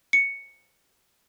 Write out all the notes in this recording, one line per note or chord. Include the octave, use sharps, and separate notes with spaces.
C#7